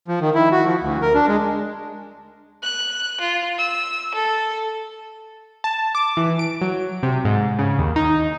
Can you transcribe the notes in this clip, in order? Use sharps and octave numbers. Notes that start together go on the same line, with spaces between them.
F3
D#3
E4
F#4
F3
D2
A#4
D4
G#3
F#6
F4
E6
A4
A5
D6
E3
D7
F#3
C3
G#2
C#3
D#2
D#4